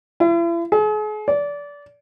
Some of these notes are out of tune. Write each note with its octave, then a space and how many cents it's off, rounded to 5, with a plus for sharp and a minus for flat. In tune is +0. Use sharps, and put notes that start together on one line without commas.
E4 +40
G#4 +40
D5 -25